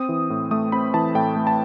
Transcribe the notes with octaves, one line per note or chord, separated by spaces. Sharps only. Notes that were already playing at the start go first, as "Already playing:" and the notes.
Already playing: C4 D#6
E3
A2
A3 D#6
C4 B5
E3 A5
A2 G5
A3
A5